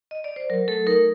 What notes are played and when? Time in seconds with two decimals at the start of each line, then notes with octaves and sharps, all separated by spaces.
0.11 D#5
0.24 D5
0.36 C5
0.50 F#3 A#4
0.68 A3 A4
0.87 D#4 A#4